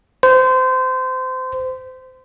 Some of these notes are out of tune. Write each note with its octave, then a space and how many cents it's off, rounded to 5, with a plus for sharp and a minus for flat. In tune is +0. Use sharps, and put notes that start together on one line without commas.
C5 -25